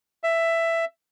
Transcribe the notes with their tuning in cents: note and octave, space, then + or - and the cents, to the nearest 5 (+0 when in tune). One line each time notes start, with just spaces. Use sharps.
E5 +10